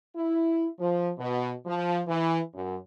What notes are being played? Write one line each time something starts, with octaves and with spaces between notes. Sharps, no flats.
E4
F3
B2
F3
E3
F#2